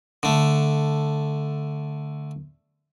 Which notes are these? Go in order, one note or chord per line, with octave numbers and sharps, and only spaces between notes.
D3 A3